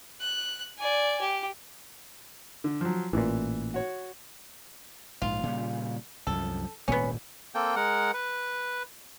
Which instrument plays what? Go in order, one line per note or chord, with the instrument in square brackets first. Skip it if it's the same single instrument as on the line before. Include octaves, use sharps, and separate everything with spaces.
[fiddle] F#6
D5 G#5
G4
[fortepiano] D3
F3 F#3
[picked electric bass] A1 A#2 [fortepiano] E3
[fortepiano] F#4 C#5
[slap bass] A#1 G#2 [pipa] F4
[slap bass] A#2 C#3 G3
[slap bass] C2 F#2 F3 [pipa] A4
[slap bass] D#1 G#1 A#2 [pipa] B3 C#4
[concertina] A#3 C4 A4 G5
G#3 A#4 F#5
B4